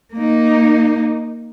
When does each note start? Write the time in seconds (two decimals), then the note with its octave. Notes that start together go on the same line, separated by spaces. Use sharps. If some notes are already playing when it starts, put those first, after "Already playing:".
0.14 A#3 D#4